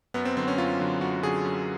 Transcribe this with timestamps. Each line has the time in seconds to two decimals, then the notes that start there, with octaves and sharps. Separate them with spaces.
0.14 F#2 B3
0.25 C4
0.37 D3 F#3 C4
0.48 C#4
0.58 F#2 F4
0.80 D3 F#3
1.01 F#2 F#4
1.23 D3 F#3 G#4
1.44 F#2